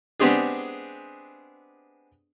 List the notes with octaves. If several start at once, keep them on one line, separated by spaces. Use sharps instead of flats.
G#3 B3 C4 D4 G4 G#4